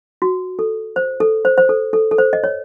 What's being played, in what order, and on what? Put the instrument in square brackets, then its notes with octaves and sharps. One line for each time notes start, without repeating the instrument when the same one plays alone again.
[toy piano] F#4
A4
C5
A4
C5
C5
A4
A4
A4
C5
D#5
C#5